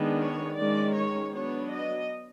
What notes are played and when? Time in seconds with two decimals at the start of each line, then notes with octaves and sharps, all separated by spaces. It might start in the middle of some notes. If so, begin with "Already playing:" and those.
Already playing: D#3 G#3 B3 D4
0.19 C#5
0.56 D#3 G#3 C#4 D5
0.95 C#5
1.33 F#3 B3 D4 C#5
1.70 D#5